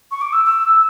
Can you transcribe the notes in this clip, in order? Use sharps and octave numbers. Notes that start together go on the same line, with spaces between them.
C#6
D6
E6
E6